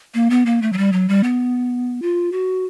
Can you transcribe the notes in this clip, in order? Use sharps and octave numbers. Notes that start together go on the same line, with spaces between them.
A#3
B3
A#3
A3
F#3
G3
F#3
G3
B3
F4
F#4